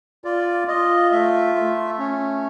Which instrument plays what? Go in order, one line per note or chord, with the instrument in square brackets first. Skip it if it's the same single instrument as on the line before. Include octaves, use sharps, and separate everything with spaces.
[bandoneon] F4 D5
F4 D#5
A3 E5
A3
C#4